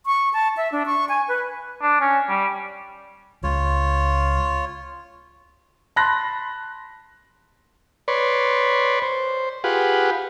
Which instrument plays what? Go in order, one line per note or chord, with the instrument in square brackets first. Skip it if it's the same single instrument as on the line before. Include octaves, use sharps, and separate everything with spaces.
[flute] C#6
A5
E5
D4
C#6
G#5
B4
[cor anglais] D4
C#4
G3
[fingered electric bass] C#2 [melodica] F4 C#5
[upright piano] A5 B5 C6 F#6 A#6
[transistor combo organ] B4 C#5 D5 C6
C5
F4 G4 G#4 B4 F#5